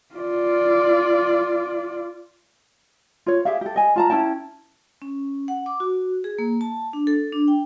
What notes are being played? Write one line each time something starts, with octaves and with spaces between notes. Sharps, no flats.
F4 D5
F4 C#5
G4 G#4 E5 F5
G4 A4
D#5 G#5
F4 A5 A#5
C#4 E4 G5 A5
C#4
F#5
D6
F#4
G#4
A#3
A5
D4
A4
D4
G5